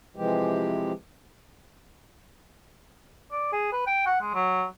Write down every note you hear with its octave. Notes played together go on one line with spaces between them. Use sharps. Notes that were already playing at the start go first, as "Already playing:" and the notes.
C3 E3 F3 G#3 G4
D5
G#4
B4
G5
F#5
G#3
F#3